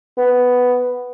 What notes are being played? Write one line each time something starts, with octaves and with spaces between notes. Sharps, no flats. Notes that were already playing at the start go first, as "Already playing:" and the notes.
B3